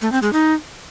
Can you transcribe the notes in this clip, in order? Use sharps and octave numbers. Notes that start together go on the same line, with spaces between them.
A3
C4
G#3
D#4